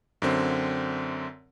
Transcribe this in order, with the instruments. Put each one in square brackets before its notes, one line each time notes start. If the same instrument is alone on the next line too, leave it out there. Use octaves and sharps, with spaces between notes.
[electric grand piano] F#2 D3 C4